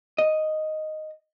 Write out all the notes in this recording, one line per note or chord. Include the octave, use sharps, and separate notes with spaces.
D#5